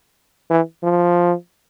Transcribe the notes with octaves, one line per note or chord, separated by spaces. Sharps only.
E3
F3